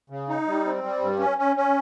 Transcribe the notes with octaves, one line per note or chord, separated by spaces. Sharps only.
C#3
D#4
G3
C4
G3
G2
C#4
C#4
C#4